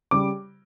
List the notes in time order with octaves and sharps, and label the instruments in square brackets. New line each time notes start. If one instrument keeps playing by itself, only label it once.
[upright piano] C#3 G3 D6